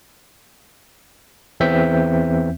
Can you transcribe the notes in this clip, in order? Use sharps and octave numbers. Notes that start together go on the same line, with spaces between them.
E2 E3 C4 E5 G6 B6